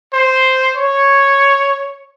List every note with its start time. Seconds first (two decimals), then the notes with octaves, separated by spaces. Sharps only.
0.13 C5
0.75 C#5